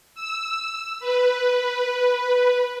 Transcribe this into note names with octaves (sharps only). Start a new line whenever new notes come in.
E6
B4